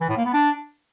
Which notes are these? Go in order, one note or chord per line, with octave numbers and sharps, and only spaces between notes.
E3
A2
A#3
B3
D4